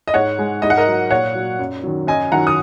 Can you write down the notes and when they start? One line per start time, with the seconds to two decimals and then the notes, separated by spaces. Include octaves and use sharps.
0.08 D#5
0.14 G#2 C#5 F#5
0.39 G#3
0.62 G#2 D#5
0.70 F#5
0.77 A#4 D#5
0.87 F#3
1.10 A#2 C#5 F#5
1.35 F#3
1.59 F#2
1.83 D#3 F#3
2.07 F#2 D#5 G#5
2.32 D#3 F#3 F#5 A#5
2.47 D#6